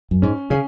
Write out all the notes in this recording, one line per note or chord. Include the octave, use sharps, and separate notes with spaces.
F#2
G#2 C#4
C#3 C#4